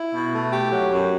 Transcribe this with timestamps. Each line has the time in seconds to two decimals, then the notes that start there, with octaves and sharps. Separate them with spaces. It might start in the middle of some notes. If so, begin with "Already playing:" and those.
Already playing: E4
0.13 B2
0.33 A3
0.52 G4
0.71 F#3
0.91 F#2